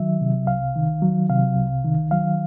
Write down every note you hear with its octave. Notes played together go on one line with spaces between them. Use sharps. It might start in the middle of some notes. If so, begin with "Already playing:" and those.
Already playing: D#3 F#3 E5
C3
C2 F5
D#3
F#3
C3 F5
C2
D#3
F#3 F5